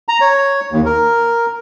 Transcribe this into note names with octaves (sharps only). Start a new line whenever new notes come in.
A#5
C#5
D#2
A#4